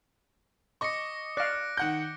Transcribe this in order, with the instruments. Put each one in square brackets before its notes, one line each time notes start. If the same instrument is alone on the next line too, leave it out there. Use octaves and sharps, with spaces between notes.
[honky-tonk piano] D#5 C#6 [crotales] D6 A#6 C#7
[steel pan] D5 F5 [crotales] F#6 A#6 D7
[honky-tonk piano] D#3 F#5 G6